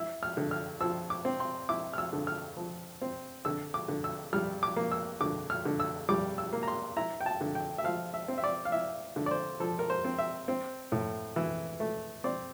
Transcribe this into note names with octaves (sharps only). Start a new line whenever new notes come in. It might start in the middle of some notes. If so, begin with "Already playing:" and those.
Already playing: E4 E6
F6
D3
F6
F3 E6
D6
C4
C6
E4 D6
F6
E6
D3
F6
F3
C4
D3 E6
D6
D3
E6
G3 F6
D6
A#3
E6
D3 D6
F6
D3
E6
G3 D6
E6
A#3
A#5
C6
E4 A#5
G5
A5
D3
G5
E5
F3 F5
E5
C4
E5
D5
F5
E4 E5
D3
D5
C5
F3 A4
A#4
C5
C4
E5
C4
A2
E3
A3
C4 D5